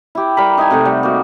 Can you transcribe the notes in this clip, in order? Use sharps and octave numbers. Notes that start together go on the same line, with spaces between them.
E4 G4
G3 A#4 B5
D#4 D#5 E5 G#5
C3 A3 F#5
G3
A#3 F#4